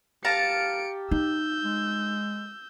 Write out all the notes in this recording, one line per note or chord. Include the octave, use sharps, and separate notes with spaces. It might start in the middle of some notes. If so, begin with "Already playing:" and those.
G4 F5 A5 A#5 C#7 D7
D#4 E6 G6
G#3